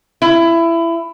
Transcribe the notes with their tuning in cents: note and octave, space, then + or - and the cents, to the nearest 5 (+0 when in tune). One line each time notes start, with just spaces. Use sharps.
E4 +20